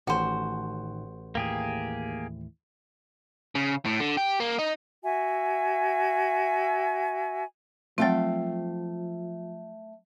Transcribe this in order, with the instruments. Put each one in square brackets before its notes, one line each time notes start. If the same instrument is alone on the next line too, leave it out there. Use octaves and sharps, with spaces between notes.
[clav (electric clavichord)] A1 [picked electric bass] A2 D#3 [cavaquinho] F#4 C5
[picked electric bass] D#2 A2 E3 [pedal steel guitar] A#3 G4 G#4
[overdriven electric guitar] C#3
A2
D3
G4
A#3
D#4
[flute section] F#4 E5 G#5
[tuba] F3 [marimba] F#3 C4 [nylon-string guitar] A3 F5 G5